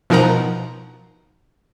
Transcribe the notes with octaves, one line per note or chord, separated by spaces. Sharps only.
B2 F3 D#4 A#4 F#5 A#5